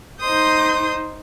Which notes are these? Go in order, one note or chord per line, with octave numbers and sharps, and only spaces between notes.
D#4 C5 C6 D#6 G6